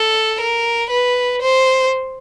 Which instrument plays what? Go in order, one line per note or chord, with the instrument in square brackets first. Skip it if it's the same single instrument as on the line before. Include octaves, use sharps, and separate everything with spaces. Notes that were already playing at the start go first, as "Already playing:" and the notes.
Already playing: [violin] A4
A#4
B4
C5